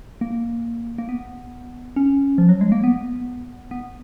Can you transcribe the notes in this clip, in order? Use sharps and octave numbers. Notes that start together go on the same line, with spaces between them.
A#3
A#3
B3
C#4
F3
F#3
G#3
A#3
B3
B3